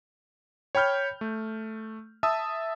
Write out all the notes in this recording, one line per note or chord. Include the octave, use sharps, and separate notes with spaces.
C#5 G5 B5 F6 G6
A3
E5 A5 D#6 E6